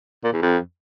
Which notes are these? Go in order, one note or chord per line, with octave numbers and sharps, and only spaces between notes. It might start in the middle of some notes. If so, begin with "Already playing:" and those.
A#2
E2
F2